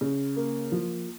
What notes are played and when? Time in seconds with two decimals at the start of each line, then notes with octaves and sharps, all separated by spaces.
0.01 C#3
0.36 A#3
0.72 F3